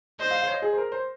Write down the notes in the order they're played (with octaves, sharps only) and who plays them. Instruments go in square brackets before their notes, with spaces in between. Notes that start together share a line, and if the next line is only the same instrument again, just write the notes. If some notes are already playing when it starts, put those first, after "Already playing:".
[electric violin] C5 [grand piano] D#5
[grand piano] F5
F5
C#5
D#5
G#4
C5
A#4
C5